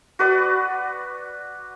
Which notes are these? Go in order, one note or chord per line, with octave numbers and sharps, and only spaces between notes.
F#4 B4 D5